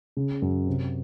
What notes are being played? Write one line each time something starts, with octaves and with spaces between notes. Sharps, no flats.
C#3
F#2
C3